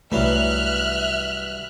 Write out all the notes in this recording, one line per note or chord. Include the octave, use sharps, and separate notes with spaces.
C2 G2 E3 F#3 A3 E5 F6 F#6